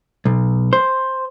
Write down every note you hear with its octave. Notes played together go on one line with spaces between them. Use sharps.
B1
C5